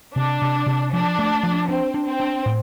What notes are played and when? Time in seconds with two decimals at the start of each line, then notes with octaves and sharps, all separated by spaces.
0.15 C3 D4
0.42 C3
0.67 C3
0.92 F3 D4
1.19 A3
1.43 F3
1.69 C4 D4
1.94 D4
2.08 C4
2.20 D4
2.46 A2